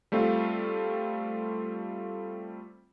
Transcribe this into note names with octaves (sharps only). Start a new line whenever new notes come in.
G3 A3 C4 F4